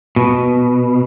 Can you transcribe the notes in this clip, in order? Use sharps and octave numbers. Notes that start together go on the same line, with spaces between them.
B2